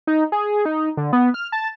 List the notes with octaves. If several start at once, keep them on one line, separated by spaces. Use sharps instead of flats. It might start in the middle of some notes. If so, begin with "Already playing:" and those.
D#4
G#4
D#4
D3
B3
F6
A5